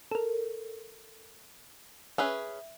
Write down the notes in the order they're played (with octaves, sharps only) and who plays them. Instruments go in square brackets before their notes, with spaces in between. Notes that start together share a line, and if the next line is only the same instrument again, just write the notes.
[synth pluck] A4 A#4
[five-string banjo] C#4 G#4 B4 [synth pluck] E5